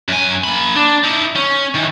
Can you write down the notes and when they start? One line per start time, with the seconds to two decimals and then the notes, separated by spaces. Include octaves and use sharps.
0.08 F#2 G#5
0.44 A#3 B5
0.76 D4
1.04 D#4 E4
1.35 C#4
1.74 D#3 E3